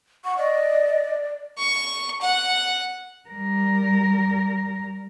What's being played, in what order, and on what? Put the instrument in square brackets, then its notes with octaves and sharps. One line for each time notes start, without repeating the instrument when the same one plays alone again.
[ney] F#5 [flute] C#6
[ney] D5 [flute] D#5
[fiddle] C#6
F#5
[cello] G3 A#4